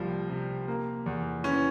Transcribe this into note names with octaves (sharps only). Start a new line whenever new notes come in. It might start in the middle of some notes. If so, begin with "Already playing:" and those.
Already playing: C2 F3 G3 A#3
C3
A#3
E2
E3 C#4